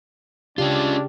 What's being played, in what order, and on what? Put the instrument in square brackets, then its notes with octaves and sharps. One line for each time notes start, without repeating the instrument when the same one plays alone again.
[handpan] C#3 G4 [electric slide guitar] C#4 F4 [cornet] D4